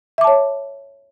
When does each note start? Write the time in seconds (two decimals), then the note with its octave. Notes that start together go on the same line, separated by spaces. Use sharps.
0.18 E5
0.21 D6
0.24 A5
0.27 C#5